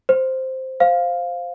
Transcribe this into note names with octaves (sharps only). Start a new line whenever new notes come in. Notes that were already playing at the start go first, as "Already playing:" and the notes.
C5
C5 F5